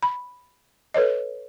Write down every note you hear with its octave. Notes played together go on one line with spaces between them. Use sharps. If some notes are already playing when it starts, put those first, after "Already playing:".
B5
A4 B4 C#5 D#5